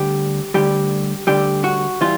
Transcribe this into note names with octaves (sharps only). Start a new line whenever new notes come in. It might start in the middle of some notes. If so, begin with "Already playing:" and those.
Already playing: D2 D3 G3 G4
D2 D3 G3 G4
D2 D3 G3 G4
F#4
E3 G3 F4